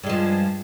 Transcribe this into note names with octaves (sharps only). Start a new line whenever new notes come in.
G2 F3 G#3